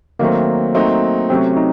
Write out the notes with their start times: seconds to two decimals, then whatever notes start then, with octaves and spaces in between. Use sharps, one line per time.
0.19 D#3 F#3 A3 A#3 C4
0.74 F#3 A3 C4 D#4
1.30 C3 F#3 A3 C4 C#4
1.57 D#4